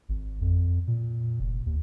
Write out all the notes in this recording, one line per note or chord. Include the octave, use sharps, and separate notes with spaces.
G#1
F2
A#2
F1
D#2